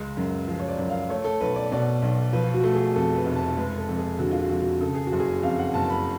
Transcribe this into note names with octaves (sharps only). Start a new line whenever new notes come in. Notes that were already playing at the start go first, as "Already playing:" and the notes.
Already playing: C#2 G#3
F#2
F3
C#5
D5
F#2
F5
A3 C#5
A4
B1 B4
D5
B2 D5
B1
F3 B4
F#4
A3
G#4
F2 A4
B4
F1
A5
G#3 B4
A4
F2
G#4
D3 F#4
F4
F#4
F2
F#4
C#3 A4
G#4
F#4
F#1
G#4
F2 F5
F#5
F#1 A5
A5
B5